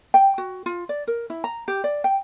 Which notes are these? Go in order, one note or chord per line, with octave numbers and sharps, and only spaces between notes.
G5
F#4
F4
D5
A#4
E4
A#5
G4
D5
G5